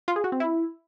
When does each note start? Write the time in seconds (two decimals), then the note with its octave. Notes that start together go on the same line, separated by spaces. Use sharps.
0.08 F4
0.16 G#4
0.24 F#4
0.32 C4
0.40 E4